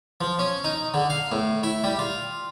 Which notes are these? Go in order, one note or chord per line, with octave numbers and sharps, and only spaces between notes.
F3
C#4
D#4
D3
F5
A2
E4
G3
F4